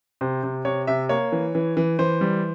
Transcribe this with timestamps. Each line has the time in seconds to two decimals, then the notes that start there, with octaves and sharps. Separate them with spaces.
0.21 C3 C5
0.43 C3
0.65 C3 C#5
0.87 C3 E5
1.09 A#3 C#5
1.32 E3
1.55 E3
1.77 E3
1.99 E3 C5
2.21 G3